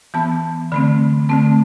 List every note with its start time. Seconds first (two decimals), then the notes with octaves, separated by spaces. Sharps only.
0.14 E3 B3 A5
0.72 D3 A3 C4 B5
1.29 D3 A3 C4 A5